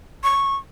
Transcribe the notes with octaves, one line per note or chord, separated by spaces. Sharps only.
C#6